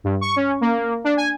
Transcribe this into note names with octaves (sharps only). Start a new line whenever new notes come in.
G2
C#6
C#4
A#3
D4
G#5